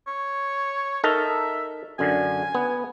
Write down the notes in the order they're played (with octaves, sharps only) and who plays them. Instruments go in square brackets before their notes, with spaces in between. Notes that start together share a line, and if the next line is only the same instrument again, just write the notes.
[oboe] C#5
[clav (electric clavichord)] D#4 A4 A#4 [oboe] E5
[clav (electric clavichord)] F#2 D3 [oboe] G#5
[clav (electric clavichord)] B3